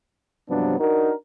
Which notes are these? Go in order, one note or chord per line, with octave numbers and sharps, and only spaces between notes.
G2 C3 F3 F#3 B3 D4
D4 D#4 F#4 A#4